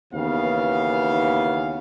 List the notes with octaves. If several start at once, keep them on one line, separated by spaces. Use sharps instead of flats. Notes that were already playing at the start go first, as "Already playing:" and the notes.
D#2 C#3 E3 B3 F5